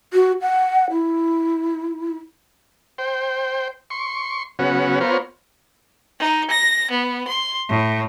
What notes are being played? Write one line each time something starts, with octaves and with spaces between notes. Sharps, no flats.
F#4
F#5
E4
C5 G5
C6 C#6
C#3 F#3 B3 C#4 F#4
B3 F4 A#4 C5 C#5
D#4
A#6
B3
C6
A2